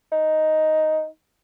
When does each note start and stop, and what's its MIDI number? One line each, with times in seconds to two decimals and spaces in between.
0.12 1.06 63